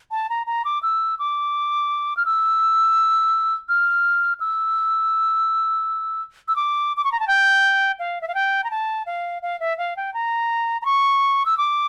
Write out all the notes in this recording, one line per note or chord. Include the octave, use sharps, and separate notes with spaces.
A5
A#5
A#5
D6
E6
D6
F6
E6
F6
E6
E6
D6
D6
C#6
A#5
A5
G5
F5
E5
F5
G5
A#5
A5
F5
F5
E5
F5
G5
A#5
A#5
C#6
E6
D6